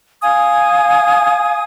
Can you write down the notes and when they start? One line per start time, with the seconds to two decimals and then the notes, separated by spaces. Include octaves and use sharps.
0.23 F5 G#5 D#6